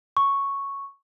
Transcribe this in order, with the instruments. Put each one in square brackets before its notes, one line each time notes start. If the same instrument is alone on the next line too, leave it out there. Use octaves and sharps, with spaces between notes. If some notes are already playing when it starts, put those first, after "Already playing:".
[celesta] C#6